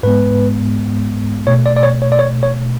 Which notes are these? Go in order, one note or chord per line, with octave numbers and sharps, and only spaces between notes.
G#2 G#3 B3 B4
B2 A3 C#5
D5
D5
C#5
C#5
D5
C#5
C#5